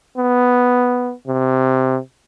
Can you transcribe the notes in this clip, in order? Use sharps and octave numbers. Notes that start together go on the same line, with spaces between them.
B3
C3